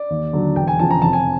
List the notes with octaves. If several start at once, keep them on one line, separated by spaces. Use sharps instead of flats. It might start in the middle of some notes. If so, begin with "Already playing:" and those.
Already playing: D5
D#2
D3 F#3
E1 G5
G#5
E2 C#3 F3 A5
A#5
F1 A5
G#5